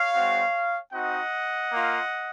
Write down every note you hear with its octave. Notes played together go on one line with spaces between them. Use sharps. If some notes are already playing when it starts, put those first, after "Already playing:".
Already playing: C#5 F5
G#3 C4 F#4
C4 D#4 F#4 D#5 F#5
A#3
F4